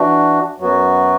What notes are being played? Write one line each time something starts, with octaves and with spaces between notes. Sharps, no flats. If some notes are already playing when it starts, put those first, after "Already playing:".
Already playing: E3 D4 F#4
F#2 F#3 B3 F#4